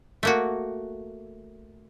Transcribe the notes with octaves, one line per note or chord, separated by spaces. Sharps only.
A3 A#3 F#4